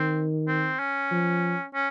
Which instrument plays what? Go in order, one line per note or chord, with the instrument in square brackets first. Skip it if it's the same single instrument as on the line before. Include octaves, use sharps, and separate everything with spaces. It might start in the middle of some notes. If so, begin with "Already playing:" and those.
Already playing: [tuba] D#3 [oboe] C4
[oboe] C4
C#4
[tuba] F3
[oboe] C#4